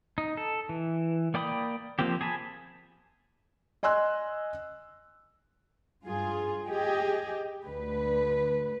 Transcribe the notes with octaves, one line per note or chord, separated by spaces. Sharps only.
D#4
A4
E3
A#3 D5 G5 B5 D#6
F3 A#3 C4 G4
G#4 G#5 A5 B5
D#5 G#5 C6 E6 F#6
G2 F4 G#4
G4 G#4 D#5
D2 D3 B4